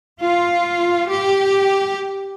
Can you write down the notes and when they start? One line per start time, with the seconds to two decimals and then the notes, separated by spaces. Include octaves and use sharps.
0.22 F4
1.10 G4